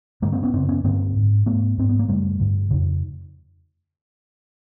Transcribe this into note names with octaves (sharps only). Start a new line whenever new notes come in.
G2 D3 G#3 A#3
A#3 C4
B3 C#4
F#2 C#3 C4 D4
B3 C#4
G2 D3 A#3 C4
G#2
G#2 A3 B3
G#2 C4
B3
A#3
F#2 C#3 G3 A3
G2 D3
F2 C#3